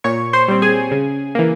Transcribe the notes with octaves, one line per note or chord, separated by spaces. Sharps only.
A#2 C#5 C#6
C5 C6
G3 C4
G#4 G#5
C#3
E3 A#3